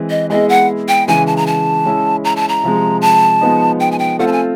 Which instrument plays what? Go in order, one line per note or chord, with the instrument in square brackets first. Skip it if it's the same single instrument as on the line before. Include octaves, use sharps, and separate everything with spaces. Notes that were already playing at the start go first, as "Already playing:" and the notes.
Already playing: [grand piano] E3 G#3 C4
[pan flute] D#5
[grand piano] G#3 B3 E4 G#4 [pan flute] D#5
[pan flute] F#5
G5
[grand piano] C#3 E3 G#3 [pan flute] G#5
[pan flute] A5
A#5
A5
[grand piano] G#3 C#4 E4
[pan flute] A#5
A5
A#5
[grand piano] C3 F3 G#3
[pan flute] A5
[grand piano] F3 G#3 B3 D#4
[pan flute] G5
G#5
G5
[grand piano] A3 C4 F4 A4 C5 [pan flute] F#5
[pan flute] A5
G#5